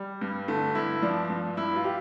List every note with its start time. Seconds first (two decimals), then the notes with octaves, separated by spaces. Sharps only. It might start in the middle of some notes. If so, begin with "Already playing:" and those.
Already playing: G3
0.22 G2
0.48 D3 A3
0.75 G2 E4
1.02 F3 D4
1.30 G2
1.57 G2 E4
1.76 F4
1.84 G4